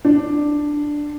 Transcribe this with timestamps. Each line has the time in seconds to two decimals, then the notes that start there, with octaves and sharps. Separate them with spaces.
0.05 D4